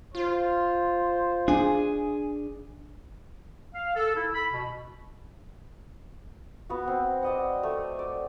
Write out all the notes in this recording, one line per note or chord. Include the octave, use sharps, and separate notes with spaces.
F4 C5
D4 G#4
F5
A4
E4
B5
B2
B3 F#4
C4
D5 D#5 F#5
A3
D5